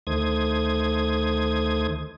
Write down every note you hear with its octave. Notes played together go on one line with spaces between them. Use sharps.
D2 D#3 A3 C5 D#6 G#6